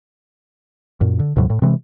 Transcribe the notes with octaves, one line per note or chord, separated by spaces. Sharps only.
F#2 A#2
D3
D#2 A2 C3 F#3
A2
C3 E3 G#3